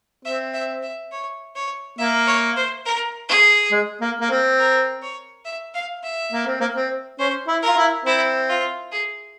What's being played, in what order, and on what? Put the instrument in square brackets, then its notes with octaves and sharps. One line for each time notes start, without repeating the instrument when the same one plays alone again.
[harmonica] C4 [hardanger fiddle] E5
[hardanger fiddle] E5
E5
C#5
C#5
[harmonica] A#3 [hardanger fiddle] E5
[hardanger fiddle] C#5
C5
A#4
G#4
[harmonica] G#3
A#3
A#3
C4
[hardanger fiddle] A#4
C#5
E5
F5
E5
[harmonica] A#3
C4
A#3
C4
[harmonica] C#4 [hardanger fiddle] C5
[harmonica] E4
[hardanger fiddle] A#4
[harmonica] F4
E4
[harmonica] C4 [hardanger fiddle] E4
[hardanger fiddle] F4
G#4